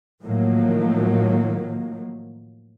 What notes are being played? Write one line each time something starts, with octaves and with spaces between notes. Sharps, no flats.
A2 D#3 F3 F#3 A#3